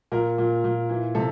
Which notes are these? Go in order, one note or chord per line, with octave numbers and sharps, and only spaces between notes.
A#2 A#4
A#2
A#2
E3
C3 A4